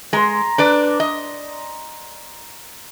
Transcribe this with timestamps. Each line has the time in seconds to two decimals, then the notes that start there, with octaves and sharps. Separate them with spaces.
0.13 G#3 A#5 C6
0.58 D4 B4 D5
1.00 D#5